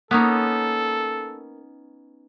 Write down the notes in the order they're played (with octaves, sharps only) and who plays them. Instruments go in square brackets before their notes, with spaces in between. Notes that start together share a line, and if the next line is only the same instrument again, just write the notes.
[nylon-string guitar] A#3 [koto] B3 C#4 D#4 [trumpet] A4